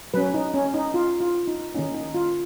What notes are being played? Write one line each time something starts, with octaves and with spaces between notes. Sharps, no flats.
F#3 C#4 B4
D#4
C#4
D#4
F4
F4
D#4
D#3 A#3 C#4 D#4
D#4
F4